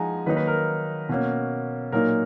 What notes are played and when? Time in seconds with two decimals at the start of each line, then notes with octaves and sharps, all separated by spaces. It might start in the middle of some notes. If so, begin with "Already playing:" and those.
Already playing: F3 G#3 D#4 F#5 G#5 A#5
0.26 D#3 F#3 A#3 D#4 B4
0.37 B4
0.47 A#4
1.09 B2 A#3 C#4
1.92 A#2 F#3 A#3 D#4 A#4